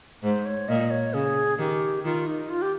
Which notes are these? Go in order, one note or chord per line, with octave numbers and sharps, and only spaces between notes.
G#2 C5
C#5
A#2 D#5
C#5
C#3 G#4
D#3 G4
D#3 F4
D#4
F4
G4